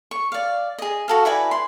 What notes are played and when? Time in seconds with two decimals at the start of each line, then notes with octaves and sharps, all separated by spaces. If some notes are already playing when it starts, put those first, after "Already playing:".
0.11 C#6
0.32 D5 F5
0.78 G#4 D#5
1.08 F#4 A4 F5
1.25 E4 B4 D5 G#5
1.51 C6